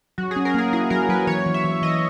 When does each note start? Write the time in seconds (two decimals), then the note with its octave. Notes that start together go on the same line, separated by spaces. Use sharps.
0.18 F#3 F#4
0.31 G#4
0.36 C#4
0.45 A#4
0.54 A#3 G#4
0.73 E4 G#4
0.90 F#3 A#4
1.09 F#3 B4
1.27 E3 C#5
1.46 E3
1.54 E5
1.64 E3
1.82 E3 D#5